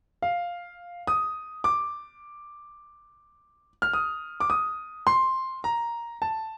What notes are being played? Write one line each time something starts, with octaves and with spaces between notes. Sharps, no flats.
F5
D#6
D6
F6
D#6
D6
D#6
C6
A#5
A5